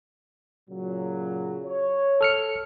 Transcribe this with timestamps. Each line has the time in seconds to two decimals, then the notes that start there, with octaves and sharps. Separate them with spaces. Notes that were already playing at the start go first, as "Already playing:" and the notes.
0.70 A#2 C#3 F#3
1.65 C#5
2.21 A4 F6 C#7